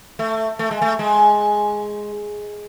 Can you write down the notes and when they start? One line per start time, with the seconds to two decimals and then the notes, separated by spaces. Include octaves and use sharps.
0.19 A3
0.59 A3
0.71 G#3
0.82 A3
0.99 G#3